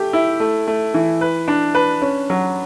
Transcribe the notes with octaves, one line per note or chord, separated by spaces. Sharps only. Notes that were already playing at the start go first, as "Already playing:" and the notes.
Already playing: A3 G4
E4
A3
A3
E3
B4
D4
B4
C#4
F#3